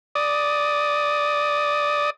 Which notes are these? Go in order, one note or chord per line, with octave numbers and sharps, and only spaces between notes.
D5 D#6